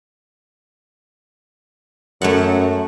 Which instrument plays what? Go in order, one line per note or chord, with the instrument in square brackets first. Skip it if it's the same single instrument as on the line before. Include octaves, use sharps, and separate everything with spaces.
[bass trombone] F#2 [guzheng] A3 C#5 F#5